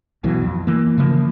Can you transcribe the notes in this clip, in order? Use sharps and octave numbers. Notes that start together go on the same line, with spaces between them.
B1 B2 E3 F#3
F2
E3 A#3
C#3 E3 F3 A#3